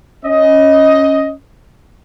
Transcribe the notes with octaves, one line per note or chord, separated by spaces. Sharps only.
C#4 D#5